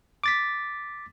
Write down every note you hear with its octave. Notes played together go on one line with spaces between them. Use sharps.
D6 A6 B6